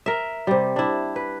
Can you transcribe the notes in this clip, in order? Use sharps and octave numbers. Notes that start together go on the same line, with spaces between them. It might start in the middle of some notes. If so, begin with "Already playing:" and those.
A#4 E5
C3 G3
D4 E4
B4